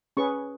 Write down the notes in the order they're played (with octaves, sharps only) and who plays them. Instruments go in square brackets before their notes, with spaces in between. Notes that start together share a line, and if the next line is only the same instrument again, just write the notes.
[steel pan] C#4 G#4 B4 C#6